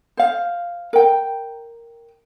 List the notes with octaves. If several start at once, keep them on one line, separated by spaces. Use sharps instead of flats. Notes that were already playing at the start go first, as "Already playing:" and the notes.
C5 F5
A#4 G5